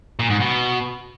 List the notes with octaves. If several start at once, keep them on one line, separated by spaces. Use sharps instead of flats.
A#2
G#2
B2